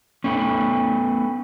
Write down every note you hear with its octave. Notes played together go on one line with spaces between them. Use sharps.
A3 B3 C#4